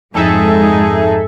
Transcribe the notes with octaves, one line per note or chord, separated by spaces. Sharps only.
F2 G#2 G#3 D#4 G#4 A4 E5